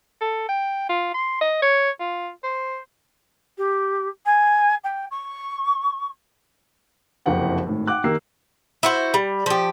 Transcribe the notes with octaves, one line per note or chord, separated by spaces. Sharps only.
A4
G5
F4
C6
D#5
C#5
F4
C5
G4
G#5
G5
C#6
F#1 C2 F2 F#5 G5
G#1 A2
F#5 G5 D6 F#6
D#3 A#3 G4 E6 C7
E4 F#4 C5
G3
F3 G4